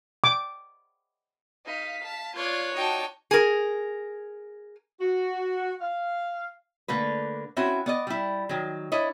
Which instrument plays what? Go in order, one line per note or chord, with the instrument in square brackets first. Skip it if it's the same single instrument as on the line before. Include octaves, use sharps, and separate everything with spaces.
[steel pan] D6
[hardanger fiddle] D#4 [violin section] F5 B6
[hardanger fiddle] A5
[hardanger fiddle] F4 [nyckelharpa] C#5 [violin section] D5 F#6 G#6
[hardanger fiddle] D#4 G5 [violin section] F#4 D5 A5
[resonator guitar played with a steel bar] G#4 A#4
[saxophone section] F#4
F5
[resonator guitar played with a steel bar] D3 A3 A#3 B4
C4 C#4 E4 F#4
B3 D5 D#5
G3 E4
D#3 F#3
D4 E4 C#5 D#5